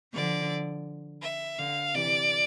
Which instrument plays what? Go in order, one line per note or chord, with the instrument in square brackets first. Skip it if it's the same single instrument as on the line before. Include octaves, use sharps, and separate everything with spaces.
[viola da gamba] D3 F3 [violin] D5
[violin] E5
[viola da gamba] D3 [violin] F5
[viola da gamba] C3 E3 [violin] D5